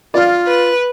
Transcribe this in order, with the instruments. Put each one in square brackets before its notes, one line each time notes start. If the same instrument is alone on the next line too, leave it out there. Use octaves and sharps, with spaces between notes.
[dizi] F4 [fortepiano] D5 F5
[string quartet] B4